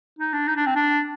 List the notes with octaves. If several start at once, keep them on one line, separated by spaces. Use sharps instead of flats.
D#4
D4
D#4
D4
C4
D4